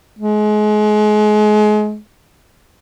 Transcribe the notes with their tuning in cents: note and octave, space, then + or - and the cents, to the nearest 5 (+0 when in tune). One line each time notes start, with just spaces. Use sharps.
G#3 +30